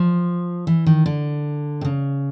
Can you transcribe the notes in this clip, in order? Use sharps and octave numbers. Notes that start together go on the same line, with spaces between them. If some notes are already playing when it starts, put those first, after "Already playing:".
Already playing: F3
E3
D#3
D3
C3
C#3